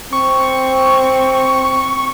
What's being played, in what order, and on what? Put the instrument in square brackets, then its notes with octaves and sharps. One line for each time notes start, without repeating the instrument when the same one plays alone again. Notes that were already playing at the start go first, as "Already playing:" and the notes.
[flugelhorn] C4 [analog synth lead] C#6